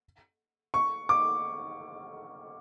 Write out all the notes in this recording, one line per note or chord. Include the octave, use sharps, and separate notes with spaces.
C#6
D6